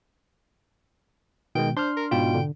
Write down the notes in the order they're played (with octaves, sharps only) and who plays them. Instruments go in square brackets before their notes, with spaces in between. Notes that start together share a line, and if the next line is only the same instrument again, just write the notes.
[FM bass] B2 [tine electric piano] D#3 G#3 [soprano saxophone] G5
[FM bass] D4 [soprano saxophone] C5 [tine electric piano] C6 F6
[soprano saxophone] A#4
[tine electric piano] G#2 B2 F4 [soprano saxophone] G5
[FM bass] D3